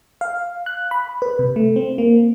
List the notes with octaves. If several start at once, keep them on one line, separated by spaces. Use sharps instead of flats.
F5
F#6
B5
B4
C3
A3
C4
A#3